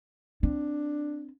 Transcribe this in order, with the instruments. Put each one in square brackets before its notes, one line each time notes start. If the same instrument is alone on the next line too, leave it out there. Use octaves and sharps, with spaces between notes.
[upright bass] C4 [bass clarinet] D4